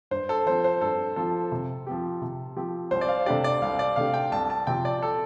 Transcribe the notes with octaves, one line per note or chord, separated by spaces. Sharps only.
G2 C5
A4
F3 C4 C5
C5
G2 A4
F3 C4 A4
C3
F3 C4 G4
C3
F3 C4 G4
C2 C5
D5
F5
C3 A3 D4 G4 D5
D5
C2 F5
D5
C3 A3 D4 G4 F5
G5
C2 A5
A5
C3 F3 C4 G4 G5
D5
A4